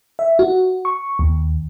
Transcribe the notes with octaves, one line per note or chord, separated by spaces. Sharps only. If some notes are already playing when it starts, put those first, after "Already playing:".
E5
F#4
C#6
D#2